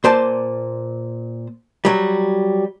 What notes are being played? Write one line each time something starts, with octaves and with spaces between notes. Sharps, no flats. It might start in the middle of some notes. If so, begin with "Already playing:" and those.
A#2 C5 D5 A5
F#3 G3